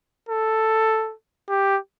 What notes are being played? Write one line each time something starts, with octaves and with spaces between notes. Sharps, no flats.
A4
G4